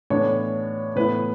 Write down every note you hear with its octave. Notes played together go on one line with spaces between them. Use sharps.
A2 E3 B3 D4 C#5
A2 E3 B3 E4 B4